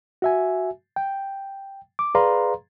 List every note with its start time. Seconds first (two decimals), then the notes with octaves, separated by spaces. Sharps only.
0.22 F#4 E5 G#5
0.96 G5
1.99 D6
2.15 G#4 B4 D5 F5 A#5 C6